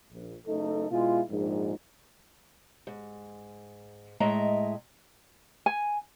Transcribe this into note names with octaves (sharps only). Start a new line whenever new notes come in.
A#1
F#1 A3 D#4 A4
B2 G#3 E4 F4
A#1 G#2
G#2
A2 G#3 D#5 E5 A#5
G#5